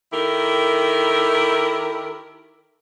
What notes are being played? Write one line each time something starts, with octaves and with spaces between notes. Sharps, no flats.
D#3 E4 G4 A4 A#4